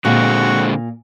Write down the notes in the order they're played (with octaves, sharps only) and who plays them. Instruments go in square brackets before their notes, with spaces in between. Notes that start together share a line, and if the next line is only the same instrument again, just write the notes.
[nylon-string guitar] A#2 [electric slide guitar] D3 G#3 C4 [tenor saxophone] F#4